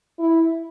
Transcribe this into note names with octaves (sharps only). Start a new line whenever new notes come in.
E4